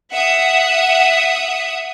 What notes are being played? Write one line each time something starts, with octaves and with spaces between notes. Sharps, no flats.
E5 F#5 D#6